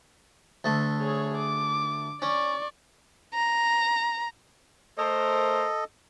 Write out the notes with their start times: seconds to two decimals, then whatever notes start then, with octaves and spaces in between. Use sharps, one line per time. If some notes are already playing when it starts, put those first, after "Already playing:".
0.64 D2 A3
1.00 G#4 C#5
1.37 D6
2.22 C#4 D5 C#6
3.34 A#5
4.98 A3 A4 A#4 C5 D#5